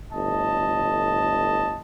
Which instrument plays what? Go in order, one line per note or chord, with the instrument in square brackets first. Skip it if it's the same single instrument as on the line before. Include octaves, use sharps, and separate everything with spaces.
[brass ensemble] G1 A2 D#5 A5